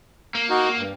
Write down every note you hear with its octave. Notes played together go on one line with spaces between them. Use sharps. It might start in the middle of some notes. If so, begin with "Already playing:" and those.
A#3
D#4 F#4
G2